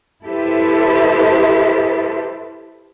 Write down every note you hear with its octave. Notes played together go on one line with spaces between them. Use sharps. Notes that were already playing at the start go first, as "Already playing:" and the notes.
E4 G4 A4 B4 C5 E5